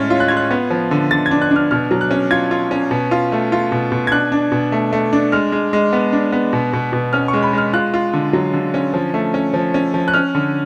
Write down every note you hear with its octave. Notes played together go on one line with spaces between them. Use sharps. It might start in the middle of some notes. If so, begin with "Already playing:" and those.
Already playing: A2 G#3 C#4 F6 A6
F4
F#6
F4 G#6
F#6
B3
F3
D3
D3 A6
G#6
D4
F#6
D4 F6
B2 F6
F#3
F#6
C#4
F4 G#6
F4
C#4
B2
F4
A3
F4
B2
B2
G#6
D4 F#6
D4
B2
A3
A3
D4
G#3 F6
G#3
G#3
B3
D4
B3
B2
B2
B2
C#4 F6
C#6
G#3
B5
G#3 F6
F4 F#6
F4
D3
F#3
D3
C#4
F3
A3
C#4
F3
C#4
F3
F#6
C#4 F6
D3